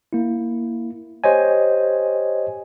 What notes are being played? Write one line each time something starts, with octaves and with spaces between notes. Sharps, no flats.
A#3 E4
G4 C5 C#5 D#5 G#5